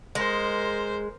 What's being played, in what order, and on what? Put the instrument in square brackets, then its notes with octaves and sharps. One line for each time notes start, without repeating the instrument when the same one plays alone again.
[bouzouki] G#3 [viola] A#4 C5